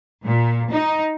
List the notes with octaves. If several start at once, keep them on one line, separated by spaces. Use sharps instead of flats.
A#2
D#4